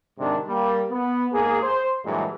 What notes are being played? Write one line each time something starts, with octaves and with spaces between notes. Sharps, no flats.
G#2 C3 D#3 G#3 D4
G3 A#3
B3
G#2 A#3 G#4
C5
G2 A#2 E3 F#3 G#3